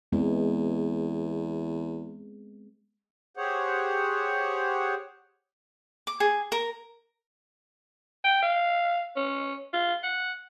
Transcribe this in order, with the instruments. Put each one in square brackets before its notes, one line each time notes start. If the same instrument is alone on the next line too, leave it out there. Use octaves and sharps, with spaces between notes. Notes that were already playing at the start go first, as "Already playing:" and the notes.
[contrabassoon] E2 [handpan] G#3 B3 C4
[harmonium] G4 G#4 C5 C#5 F#5
[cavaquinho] D6
G#4
A#4
[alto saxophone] G5
F5
C#4
F4
F#5